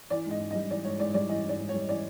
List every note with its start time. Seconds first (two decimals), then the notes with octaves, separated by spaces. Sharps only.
0.10 E3 D5
0.26 G#2 D#5
0.41 G#2
0.51 D#5
0.55 G3
0.70 E3 D5
0.84 G#2 C#5
0.99 G#2 D5
1.14 G3 D5
1.29 E3 D#5
1.44 G#2 D5
1.59 G#2
1.69 C#5
1.74 G3
1.88 E3 D5